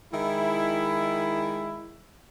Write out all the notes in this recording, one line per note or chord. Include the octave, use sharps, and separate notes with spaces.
D#3 G#3 E4